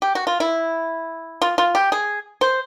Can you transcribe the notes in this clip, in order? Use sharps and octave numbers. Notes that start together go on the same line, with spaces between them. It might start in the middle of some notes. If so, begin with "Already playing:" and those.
G4
F#4
F4
E4
F4
F4
G4
G#4
C5